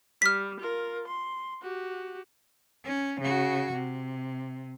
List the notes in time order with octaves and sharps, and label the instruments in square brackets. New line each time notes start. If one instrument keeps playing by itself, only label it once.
[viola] G3 [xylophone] F6 B6
[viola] F4 A#4
C6
F#4 G4
[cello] C#4
C#3 F#4
C3